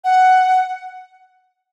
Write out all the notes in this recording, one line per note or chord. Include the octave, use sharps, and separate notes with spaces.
F#5